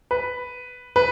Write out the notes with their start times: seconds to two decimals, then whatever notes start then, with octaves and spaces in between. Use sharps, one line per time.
0.11 B4
0.96 B4